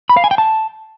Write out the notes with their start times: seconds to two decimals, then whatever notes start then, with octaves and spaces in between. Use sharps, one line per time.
0.09 B5
0.17 F5
0.24 G#5
0.31 G5
0.38 A5